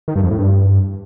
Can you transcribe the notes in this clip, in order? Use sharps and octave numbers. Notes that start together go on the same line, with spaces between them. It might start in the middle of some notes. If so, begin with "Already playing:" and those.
D#3
G2
F2
A2
G2